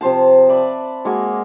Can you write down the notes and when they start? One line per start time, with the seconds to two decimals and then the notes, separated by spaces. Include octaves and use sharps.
0.01 C3 F3 C5 A5
0.49 B4 D5 E5 B5
1.05 G#3 A#3 F#4 G#5